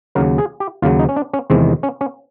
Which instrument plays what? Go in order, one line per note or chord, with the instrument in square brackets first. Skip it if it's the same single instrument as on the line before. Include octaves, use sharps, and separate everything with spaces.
[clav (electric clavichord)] D#2 C#3 F#3 A#4
G#4
G4
D#2 C#3 F#3 F4
D#4
C#4
D4
C#4
E2 C3 D#3 G#3 C4
C#4
C#4